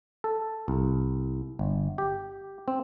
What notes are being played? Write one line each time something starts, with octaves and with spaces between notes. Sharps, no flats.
A4
C2
G1
G4
C4